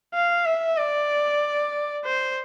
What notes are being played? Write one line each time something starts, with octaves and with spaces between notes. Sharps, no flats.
F5
E5
D5
C5